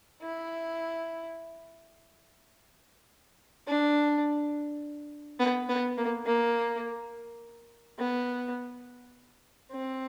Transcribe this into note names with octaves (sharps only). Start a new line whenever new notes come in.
E4
D4
B3
B3
A#3
A#3
B3
C4